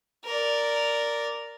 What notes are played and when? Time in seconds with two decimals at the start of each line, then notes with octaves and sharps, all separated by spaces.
0.25 A#4 D5